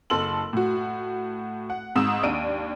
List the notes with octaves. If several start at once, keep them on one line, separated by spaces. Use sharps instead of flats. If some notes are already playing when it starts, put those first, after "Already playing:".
F#1 A4 C6 E6 F#7
A2 F#4
F#5
G#1 G#2 D#6 E6 E7
D#2 D4 D7 D#7